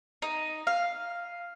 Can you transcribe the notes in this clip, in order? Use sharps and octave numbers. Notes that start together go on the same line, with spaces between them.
D#4
F5